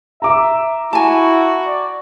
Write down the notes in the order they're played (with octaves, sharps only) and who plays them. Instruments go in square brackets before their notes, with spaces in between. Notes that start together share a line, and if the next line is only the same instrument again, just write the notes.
[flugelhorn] E5 [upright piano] A#5 D6
[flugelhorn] E4 [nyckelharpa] F#4 [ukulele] G#5 A5
[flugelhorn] D5